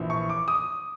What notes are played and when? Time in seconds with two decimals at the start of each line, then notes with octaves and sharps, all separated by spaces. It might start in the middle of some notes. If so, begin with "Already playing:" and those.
Already playing: A#1 E3
0.10 C#6
0.29 D6
0.48 D#6